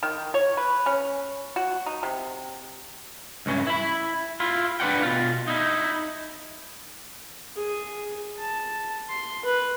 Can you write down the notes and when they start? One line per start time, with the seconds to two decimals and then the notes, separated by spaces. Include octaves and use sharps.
0.03 D#3
0.34 C#5
0.57 B4
0.86 C#4
1.56 F#4
1.86 D#4
2.03 C3
3.46 C#2 G2 C#4
3.67 E4 B5
4.40 E4 F4
4.80 D4 B4 C#5 D5 F#5 G5
5.02 B2 F4
5.48 D#4 E4
7.56 G#4
8.39 A5
9.09 C6
9.45 B4